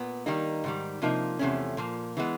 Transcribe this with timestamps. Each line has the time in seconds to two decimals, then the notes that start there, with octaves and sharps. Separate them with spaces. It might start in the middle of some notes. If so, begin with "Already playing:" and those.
Already playing: A#2 B3
0.26 D#3 G3 A#3 D#4
0.64 G#2 D#3 G3
1.02 C3 F3 A#3 D#4
1.39 E2 C3 F3 A3 C#4
1.77 A#2 F3 A#3
2.17 E3 G#3 B3